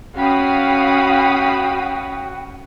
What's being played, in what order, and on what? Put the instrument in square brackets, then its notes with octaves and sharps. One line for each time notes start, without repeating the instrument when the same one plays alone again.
[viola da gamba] C#4 [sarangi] F#4 [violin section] F5 B5 D#6 [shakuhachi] G5